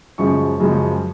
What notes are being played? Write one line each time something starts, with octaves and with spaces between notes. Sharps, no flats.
F#2 C#3 F3 G#3 C#6
F#2 C#3 F3 G#3